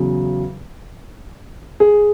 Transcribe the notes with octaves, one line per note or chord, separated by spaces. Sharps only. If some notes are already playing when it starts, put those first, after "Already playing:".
Already playing: E2 C#3 F#3
G#4